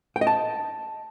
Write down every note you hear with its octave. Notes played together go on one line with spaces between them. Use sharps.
G5
D#5
A5